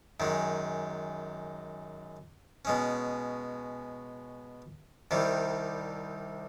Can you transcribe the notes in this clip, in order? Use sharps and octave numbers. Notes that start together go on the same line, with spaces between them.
F#2 D#3 G#3
B2 G#3 C#4
C2 C3 D#3 G3